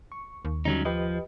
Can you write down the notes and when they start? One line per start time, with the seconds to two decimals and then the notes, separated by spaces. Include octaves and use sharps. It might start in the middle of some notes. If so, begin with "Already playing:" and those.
0.12 C#6
0.45 D#2
0.65 D3 F#3 G3 C#4 D#4
0.85 F3 G4 B4 D#5